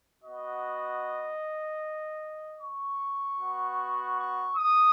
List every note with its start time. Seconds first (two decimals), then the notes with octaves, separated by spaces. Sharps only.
0.24 B3 F#4 D#5
2.60 C#6
3.40 B3 F#4
4.18 C#6
4.57 D#6